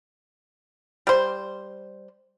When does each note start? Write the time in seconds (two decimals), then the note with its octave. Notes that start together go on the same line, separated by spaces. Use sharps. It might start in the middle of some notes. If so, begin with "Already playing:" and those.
1.07 G3 C5